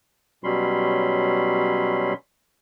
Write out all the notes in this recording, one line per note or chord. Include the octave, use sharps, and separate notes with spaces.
B2 F#3 G3 C#4 B5 C6